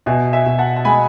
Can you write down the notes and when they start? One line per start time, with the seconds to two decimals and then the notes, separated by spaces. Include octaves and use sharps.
0.06 B2 E5 G#5
0.33 E5 G#5
0.46 B2
0.58 F#5 A5
0.76 A5
0.85 G#3 G#5 B5